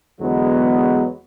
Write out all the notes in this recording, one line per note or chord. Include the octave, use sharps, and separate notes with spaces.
E2 D3 F#3 G#3 B3